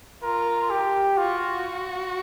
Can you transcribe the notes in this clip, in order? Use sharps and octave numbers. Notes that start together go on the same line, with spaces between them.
F4 A#4
G4
F4 F#4